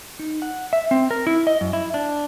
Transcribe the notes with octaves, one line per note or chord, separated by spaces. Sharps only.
D#4
F#5
E5
C4
A#4
E4
D#5
F#2
E4
D4